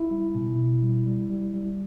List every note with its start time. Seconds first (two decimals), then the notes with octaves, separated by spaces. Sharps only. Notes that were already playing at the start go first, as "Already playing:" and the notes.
Already playing: E4
0.11 G3
0.35 B2
0.59 B2
0.82 G3
1.06 G3
1.30 G3
1.54 G3